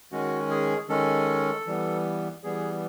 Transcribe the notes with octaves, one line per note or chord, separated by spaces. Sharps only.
D#3 G#3 C#4 F#4
G#4
D#3 G#3 C#4 A4
E3 G3 B3
E3 G3 B3 G#4